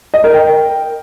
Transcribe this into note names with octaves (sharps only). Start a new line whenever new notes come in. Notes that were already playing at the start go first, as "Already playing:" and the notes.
D#5
A#4
G5